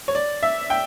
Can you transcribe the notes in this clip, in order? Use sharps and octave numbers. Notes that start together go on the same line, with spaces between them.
C#5
D5
E5
G5